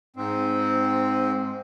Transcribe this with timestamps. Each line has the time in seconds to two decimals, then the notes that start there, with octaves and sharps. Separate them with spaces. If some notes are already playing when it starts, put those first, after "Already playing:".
0.16 G#2 C4